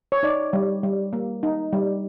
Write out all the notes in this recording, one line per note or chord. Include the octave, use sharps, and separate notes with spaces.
C#5
D#4 D5
G3
G3
A#3
D#4
G3